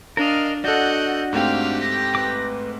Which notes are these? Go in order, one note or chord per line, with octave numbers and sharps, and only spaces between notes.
D4 A#4 D#5 F5 F6
D4 F#4 A4 D5 D#5 F#5 G6
G#2 A3 C4 G4 F5 G5
A#6
B4 D6